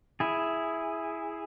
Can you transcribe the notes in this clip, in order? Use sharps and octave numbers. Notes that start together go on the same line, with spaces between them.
E4 G#4